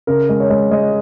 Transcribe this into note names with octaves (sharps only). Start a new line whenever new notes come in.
C#3 A#4
G#3
C#5
G#3
G#3 D#5